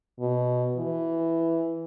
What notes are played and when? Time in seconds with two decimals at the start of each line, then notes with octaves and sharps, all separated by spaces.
0.20 B2
0.77 E3